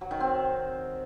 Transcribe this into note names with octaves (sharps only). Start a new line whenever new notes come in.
F#3
D#3
C4